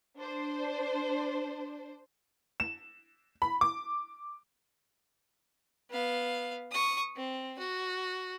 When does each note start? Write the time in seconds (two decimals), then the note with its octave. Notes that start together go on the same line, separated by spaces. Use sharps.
0.17 D4 C5
2.60 E7
3.42 B5
3.61 D6
5.90 B3 F5
6.71 C#6 D#6
7.16 C4
7.59 F#4